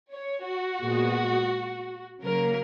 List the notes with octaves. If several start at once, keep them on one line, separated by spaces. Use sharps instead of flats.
C#5
F#4
A#2 G#3 B3
C#3 F#3 A#3 A#4